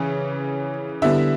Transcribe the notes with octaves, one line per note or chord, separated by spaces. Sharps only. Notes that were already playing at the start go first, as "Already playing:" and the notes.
Already playing: C#3 E3 C#5
D3 G3 B3 E4 E5